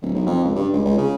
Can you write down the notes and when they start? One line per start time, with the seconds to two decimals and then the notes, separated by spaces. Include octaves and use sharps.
0.02 D1
0.14 B1
0.27 F2
0.44 C#2
0.55 G2
0.73 C#2
0.85 C#2
0.98 C#3